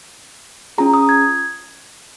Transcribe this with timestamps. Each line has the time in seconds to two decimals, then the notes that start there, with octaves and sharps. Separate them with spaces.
0.78 C#4 F4 G#4 A#5
0.94 D#6
1.09 G#6